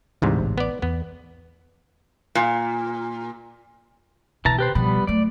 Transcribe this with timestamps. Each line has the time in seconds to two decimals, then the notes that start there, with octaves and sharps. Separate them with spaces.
0.22 D2 G#2 C3 E3
0.38 A1
0.58 B3 D5
0.82 E2 B3
2.35 A#2
4.45 B2 D#3 E3 A5 A#5
4.59 G4 B4 C5
4.75 B2 F3 G3 B3 B5
5.07 F#3 A3 D5